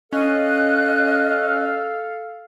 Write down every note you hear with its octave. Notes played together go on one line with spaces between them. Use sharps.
C#4 A4 D#5 F5 F#6